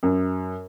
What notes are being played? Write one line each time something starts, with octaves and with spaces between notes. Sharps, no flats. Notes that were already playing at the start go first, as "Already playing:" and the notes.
F#2